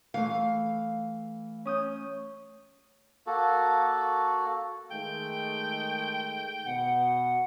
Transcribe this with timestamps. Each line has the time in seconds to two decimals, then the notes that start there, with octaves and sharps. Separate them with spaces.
0.14 E3 A3 F5
1.65 C#4 D#6 G6
3.27 A#3 F#4 A4
4.91 D#3 G#3 A3 G5
6.65 B2 F#5